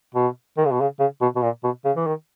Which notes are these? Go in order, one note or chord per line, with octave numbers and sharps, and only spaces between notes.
B2
D#3
C#3
B2
C#3
C#3
B2
B2
A#2
B2
C#3
E3
D#3